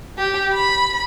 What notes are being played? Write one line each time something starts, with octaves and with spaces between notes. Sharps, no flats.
G4
B5